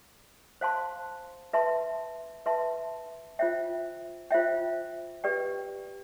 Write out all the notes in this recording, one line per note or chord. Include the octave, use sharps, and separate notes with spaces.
C5 F5 A5 C6
B4 E5 A5 C6
B4 E5 A5 C6
F4 C5 E5 G5
F4 C5 E5 G5
G4 B4 D5 G5